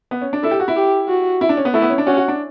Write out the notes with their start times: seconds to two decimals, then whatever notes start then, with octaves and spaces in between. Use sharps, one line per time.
0.11 B3
0.21 C#4
0.33 D4
0.43 E4 A4
0.51 G4
0.60 F#4
0.68 E4
0.76 G4
1.09 F#4
1.41 E4
1.49 D4
1.57 C#4
1.65 B3
1.74 A3 E4
1.82 B3
1.90 C#4
1.98 D4
2.07 C#4 F#4
2.17 F#4
2.28 D4